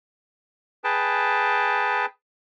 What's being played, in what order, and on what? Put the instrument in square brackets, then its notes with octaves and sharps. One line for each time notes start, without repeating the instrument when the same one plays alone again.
[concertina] G#4 B4 G5 A5